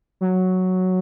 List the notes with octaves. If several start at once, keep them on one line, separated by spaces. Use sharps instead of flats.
F#3